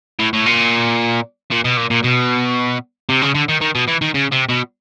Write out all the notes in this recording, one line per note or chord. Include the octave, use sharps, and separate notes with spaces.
A2
A2
A#2
A#2
B2
A#2
A#2
B2
C3
C#3
D3
D#3
D#3
B2
E3
D#3
C#3
C3
B2